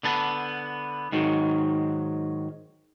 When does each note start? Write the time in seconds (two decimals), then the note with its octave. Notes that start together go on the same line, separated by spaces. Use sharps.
0.03 D3 B3 A5
1.12 G#2 D#3 F#3